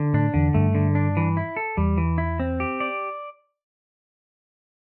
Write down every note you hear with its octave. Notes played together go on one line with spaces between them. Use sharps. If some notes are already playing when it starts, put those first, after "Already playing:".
Already playing: D3
A2 D4
E2 D3
G2 A3
D3
D4
E3
E4
A4
E2 G3
E3
E4
C4
G4
D5